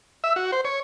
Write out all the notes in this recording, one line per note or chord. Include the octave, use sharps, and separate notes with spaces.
E5
F#4
C5
C#5